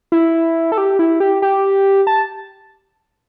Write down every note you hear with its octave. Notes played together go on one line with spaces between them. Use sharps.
E4
A4
G4
E4
G4
G4
A5